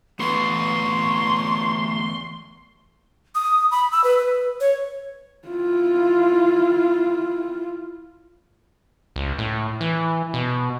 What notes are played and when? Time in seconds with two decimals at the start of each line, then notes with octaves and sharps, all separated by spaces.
0.20 D3 E3 A3 B3 B4 C6 C#6
3.35 D#6
3.71 B5
3.92 E6
4.04 B4
4.18 B4
4.60 C#5
5.48 E4 F4
9.16 C#2
9.38 A2
9.81 E3
10.34 B2